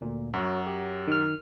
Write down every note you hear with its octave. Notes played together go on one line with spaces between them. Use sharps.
D2 A#2
F#2 F#3 F#4 C#5
G4
D#3 F6